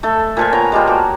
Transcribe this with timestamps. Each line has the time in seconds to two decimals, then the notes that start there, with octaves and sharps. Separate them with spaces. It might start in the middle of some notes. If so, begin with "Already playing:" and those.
0.03 A3 A4
0.37 A#2 F3 G#5
0.53 B3 C#5 G5 A#5
0.72 F3 G3 G#3
0.87 A#3 F#4 G4